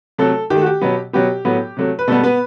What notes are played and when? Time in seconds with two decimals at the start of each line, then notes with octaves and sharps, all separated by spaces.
0.18 C3 F#3 A3 A4
0.50 D#3 G4
0.56 A3
0.62 F#4
0.66 G4
0.81 B2 F#3 B3
1.13 B2 F#3 B3 G4
1.45 A2 F#3 B3
1.77 C3 F#3 A3
1.99 B4
2.08 B2 G3 A3 B3 A4
2.24 B3 B4